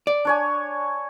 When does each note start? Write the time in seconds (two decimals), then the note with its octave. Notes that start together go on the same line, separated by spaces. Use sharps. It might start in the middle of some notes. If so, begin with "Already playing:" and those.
0.07 D5
0.25 D4 C#5 G#5